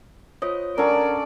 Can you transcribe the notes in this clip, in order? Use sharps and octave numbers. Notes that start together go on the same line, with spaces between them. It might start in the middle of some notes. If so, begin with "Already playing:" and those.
F4 C5 C#5 D#5
C#4 D4 A4 A#4 D5 F#5 A#5